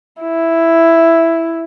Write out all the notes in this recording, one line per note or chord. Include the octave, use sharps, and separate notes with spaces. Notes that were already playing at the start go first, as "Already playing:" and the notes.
E4